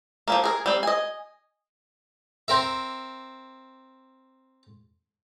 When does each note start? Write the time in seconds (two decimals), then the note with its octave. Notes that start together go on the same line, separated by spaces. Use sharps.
0.28 F3 G3 A#3
0.44 G#4 A#4
0.66 G3 C4
0.83 D#5 G#5
2.48 C4 A#4 E5